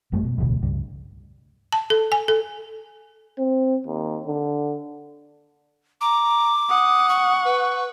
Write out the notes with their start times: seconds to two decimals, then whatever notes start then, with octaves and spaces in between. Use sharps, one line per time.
0.12 G#1 F#2 G3 A3
0.24 B2
0.38 E1 A1 D2 B2
0.62 C#2 G2
1.73 A5
1.90 A4
2.12 G#5
2.28 A4
3.38 C4
3.87 D#2
4.26 D3
6.01 A#5 D6
6.69 F#5 D#6
7.09 C#6
7.45 B4